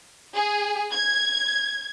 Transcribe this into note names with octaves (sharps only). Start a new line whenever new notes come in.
G#4
G#6